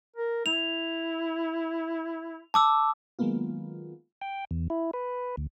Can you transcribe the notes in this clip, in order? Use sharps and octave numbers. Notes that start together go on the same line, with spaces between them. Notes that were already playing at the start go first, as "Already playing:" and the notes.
A#4
E4 F7
A5 D6 E6
D#3 F#3 G#3 A#3 B3 F4
G5
E2
E4
B4
D2